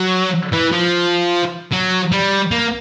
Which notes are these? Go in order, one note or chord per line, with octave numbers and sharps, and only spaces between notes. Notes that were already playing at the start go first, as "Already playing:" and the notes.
Already playing: F#3
E3
F3
F#3
G3
A#3